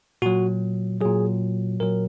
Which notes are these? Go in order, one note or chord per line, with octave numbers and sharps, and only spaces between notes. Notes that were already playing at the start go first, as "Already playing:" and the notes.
A#2 F#3 F#4
A#2 F#3 G#4
A#2 F#3 A#4